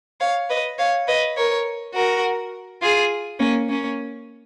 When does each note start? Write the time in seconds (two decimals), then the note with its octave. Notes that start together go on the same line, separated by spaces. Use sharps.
0.21 C#5 F5
0.49 B4 D#5
0.78 C#5 F5
1.08 B4 D#5
1.37 A#4 C#5
1.94 F#4 A#4
2.82 F4 G#4
3.40 A#3 C#4
3.69 A#3 C#4